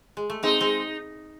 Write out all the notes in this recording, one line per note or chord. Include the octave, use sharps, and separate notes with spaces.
G#3
A3
G#3 C4 D#4
G#3 C4